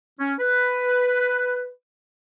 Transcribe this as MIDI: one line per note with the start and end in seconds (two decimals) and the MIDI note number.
0.19 0.33 61
0.39 1.70 71